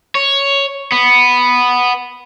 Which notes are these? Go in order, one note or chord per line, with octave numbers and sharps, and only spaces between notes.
C#5
B3